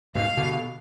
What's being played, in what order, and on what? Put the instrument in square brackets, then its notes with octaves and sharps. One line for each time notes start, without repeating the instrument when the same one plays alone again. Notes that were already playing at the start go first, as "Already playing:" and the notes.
[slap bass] G#2 B2 [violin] F5
[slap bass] B2 D3